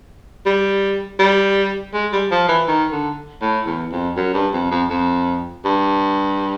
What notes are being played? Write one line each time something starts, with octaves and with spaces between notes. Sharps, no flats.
G3
G3
G#3
G3
F3
E3
D#3
D3
A2
E2
F2
F#2
G2
F2
F2
F2
G2